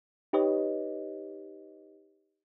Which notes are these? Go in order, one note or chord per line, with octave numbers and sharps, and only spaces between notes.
D#4 G4 B4 C#5 D#5